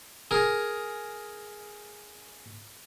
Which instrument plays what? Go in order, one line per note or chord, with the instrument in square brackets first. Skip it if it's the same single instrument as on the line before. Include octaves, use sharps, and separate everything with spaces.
[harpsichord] G#4 A#4